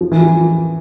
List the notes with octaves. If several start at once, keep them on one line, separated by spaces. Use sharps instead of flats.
F3
E3
F3